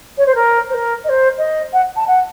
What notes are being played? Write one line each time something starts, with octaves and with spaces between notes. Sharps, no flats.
C#5
C5
A#4
C5
A#4
D#5
C5
D#5
F#5
A5
F#5